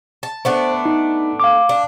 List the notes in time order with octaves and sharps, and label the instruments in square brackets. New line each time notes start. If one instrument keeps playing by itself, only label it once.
[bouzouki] A5
[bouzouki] A3 B3 D4 [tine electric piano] C5
[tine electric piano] D#4
F5 D6
[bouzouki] D4